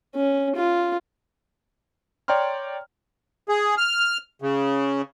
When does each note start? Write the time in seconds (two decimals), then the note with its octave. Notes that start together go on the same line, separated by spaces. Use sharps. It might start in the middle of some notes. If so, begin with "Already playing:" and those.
0.15 C#4
0.55 F4
2.28 C#5 D5 G5 A#5 C6 F6
3.49 G#4
3.78 F6
4.42 C#3